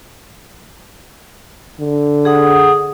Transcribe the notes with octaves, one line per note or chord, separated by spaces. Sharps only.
D3
G#4 F#5 D#6